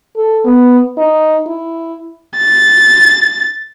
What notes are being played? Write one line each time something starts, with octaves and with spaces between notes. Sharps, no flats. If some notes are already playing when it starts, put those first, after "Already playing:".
A4
B3
D#4
E4
A6